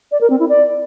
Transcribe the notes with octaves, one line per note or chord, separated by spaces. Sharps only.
D5
A#4
C4
E4
D5